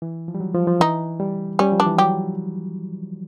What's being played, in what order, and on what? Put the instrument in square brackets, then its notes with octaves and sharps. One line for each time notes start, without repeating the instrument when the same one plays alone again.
[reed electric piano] E3
F3
G3
F#3
F3
F3
[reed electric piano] E3 [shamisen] D#4
[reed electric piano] G3
[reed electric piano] G3 [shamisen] C#4
[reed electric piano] F3
[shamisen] D4
[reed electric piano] E3
[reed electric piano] F#3 [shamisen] G4